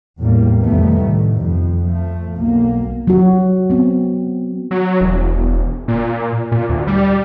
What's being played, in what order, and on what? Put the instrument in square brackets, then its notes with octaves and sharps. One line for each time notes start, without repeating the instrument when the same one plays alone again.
[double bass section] E2 A2 G3 A#3
C2 F2 D#3 G3 A3 B3
C2 A2
F2
F3 A3
B1 A#3
[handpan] F#3 F#4
B3 C4
[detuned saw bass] F#3
E1
A#2
A#2
D2
G3